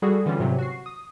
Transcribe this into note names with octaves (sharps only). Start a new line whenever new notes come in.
G3 F#4 G#4 A4
D3 E3 G3 C#4 F4
G#2 C3 E3 F#3 C4
F#4 C7
D#6